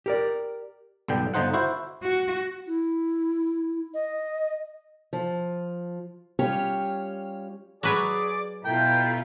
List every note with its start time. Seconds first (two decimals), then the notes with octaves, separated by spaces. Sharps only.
0.06 G4 A#4 D5
1.08 B1 G2 D3 G5
1.34 G1 D3 D#4 C5 F#5
1.53 E4 F#4 C5
2.03 F#4
2.67 E4
3.94 D#5
5.13 F3
6.39 G3 C#4 F4 G4 C#5
7.83 F#3 G#4 B4 C#5 D5
8.65 B2 E4 F4 A4 G5 A5 A#5